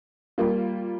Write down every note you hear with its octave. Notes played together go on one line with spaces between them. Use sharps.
G3 A#3 F4